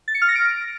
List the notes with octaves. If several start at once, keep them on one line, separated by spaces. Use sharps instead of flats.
A6
C#7
F6
A#6
D7